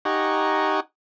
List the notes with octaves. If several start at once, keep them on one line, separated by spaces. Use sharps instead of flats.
D#4 G4 F#5 G#5 A#5 C#6